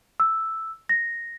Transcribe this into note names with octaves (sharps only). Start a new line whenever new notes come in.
E6
A#6